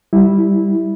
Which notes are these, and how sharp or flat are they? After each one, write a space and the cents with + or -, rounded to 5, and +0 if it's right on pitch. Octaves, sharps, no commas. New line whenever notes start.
G3 +0 E4 -10